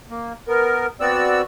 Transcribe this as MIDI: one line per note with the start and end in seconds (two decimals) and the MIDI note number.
0.10 0.33 58
0.48 0.86 59
0.48 0.86 70
1.00 1.42 59
1.00 1.42 60
1.00 1.42 66
1.00 1.42 74
1.00 1.42 88